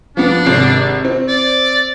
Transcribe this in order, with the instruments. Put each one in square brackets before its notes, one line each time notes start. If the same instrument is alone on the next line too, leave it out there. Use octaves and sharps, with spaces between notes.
[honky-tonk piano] F3 B3 [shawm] D4
[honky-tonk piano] G#1 C3 C7
C4
[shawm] D5